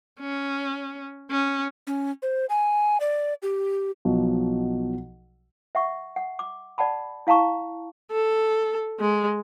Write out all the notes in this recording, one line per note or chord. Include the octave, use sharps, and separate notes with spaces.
C#4
C#4
C#4
C5
G#5
D5
G4
B1 B2 F3 F#3
E5 F#5 C#6
F#5
D6
D5 F#5 A5 B5
E4 F5 A5 A#5 C#6
A4
G#3